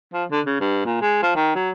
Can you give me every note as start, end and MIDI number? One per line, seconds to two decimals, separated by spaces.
0.13 0.24 53
0.31 0.40 50
0.46 0.55 49
0.60 0.81 43
0.85 0.97 46
1.01 1.20 56
1.22 1.33 53
1.36 1.54 51
1.55 1.71 54